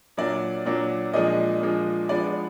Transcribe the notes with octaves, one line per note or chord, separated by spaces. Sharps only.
A#2 F#3 D4 D5
A#2 F#3 D4
A#2 F3 G#3 D4 D#5
A#2 F3 G#3 D4
F3 G#3 B3 D4 D5